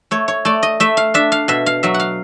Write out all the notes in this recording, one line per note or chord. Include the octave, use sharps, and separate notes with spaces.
A3 C#5
C#5
A3 D5
D#5
A3 E5
F5
D4 E5
F5
B2 E5
F5
F#3 E5
F#5
F5